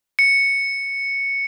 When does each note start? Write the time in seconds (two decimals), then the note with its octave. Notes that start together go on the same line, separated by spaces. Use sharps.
0.19 C#7